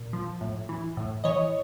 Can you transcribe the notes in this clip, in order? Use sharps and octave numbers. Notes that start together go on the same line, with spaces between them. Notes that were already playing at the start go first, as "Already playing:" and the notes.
Already playing: A#2
F3
A2
E3
A2
E3 C#5 D#5